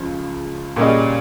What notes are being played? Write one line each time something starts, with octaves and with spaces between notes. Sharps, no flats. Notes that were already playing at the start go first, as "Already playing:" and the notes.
Already playing: C#2 C#3 F3
A#2 G3 C#4 G#4 D#5